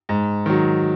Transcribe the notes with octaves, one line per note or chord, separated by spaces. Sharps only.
G#2
D#3 F#3